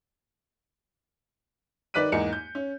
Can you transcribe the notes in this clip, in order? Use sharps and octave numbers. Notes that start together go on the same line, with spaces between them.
D#3 B4 D5 F#6 B6 D#7
E2 G#2 A#3 D#4 C#7
G6
C#4